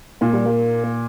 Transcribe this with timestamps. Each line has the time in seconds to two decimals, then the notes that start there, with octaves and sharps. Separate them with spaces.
0.21 A#2 A#3
0.33 G3
0.46 A#3